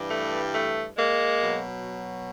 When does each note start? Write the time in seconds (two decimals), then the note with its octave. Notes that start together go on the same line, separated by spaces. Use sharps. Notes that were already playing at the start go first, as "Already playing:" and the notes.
Already playing: G2 E3 G3
0.09 A3
0.54 A3
0.97 G#3 A#3
1.42 B2 F#3